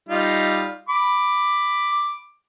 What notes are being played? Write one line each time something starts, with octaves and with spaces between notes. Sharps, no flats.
G3 D#4 F4
B5 D6